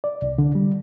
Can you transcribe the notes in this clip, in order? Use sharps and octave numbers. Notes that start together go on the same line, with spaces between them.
D5
C2
D3
G3